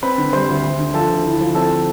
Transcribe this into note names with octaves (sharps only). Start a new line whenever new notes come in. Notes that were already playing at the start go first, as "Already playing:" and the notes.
C4 B4 B5
D3
G3 C5 C6
D2
D2
D3
F3 A4 A5
D2
E4
F3
C4 A4 A5